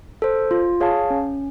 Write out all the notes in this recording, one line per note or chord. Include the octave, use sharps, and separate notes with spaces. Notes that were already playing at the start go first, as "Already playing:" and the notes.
A4 C5
F4
G#4 C#5 F5 A5
C#4